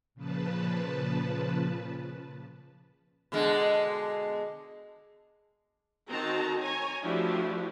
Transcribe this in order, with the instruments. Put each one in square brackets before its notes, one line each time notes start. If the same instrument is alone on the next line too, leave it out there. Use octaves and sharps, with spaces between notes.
[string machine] A#2 C#3 F3 B4 A5
[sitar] B2 D3 G#3
[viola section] D#3 C4 F#4 A5 A#5
C#5 G#5 A#5
F3 A3 D4 E4 F#4 G4